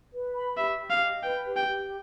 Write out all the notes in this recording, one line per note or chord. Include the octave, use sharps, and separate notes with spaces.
B4
B5
G4 E5
G4
F5
D#5
B4 G5
G4
G5
G4